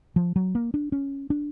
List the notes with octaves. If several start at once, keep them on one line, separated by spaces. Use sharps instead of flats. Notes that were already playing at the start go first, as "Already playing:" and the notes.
F3
F#3
A#3
D4
C#4
D4